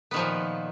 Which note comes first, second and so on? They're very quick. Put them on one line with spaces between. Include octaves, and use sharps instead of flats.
B3 D#3 F3 A#2